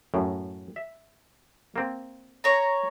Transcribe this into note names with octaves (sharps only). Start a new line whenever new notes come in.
F#2 A2
E5
A#3 C4
C#5 A#5